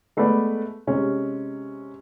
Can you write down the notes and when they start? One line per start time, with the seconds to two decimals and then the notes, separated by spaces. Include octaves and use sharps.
0.17 G#3 A3 B3 B4 D5
0.87 C3 G#3 C#4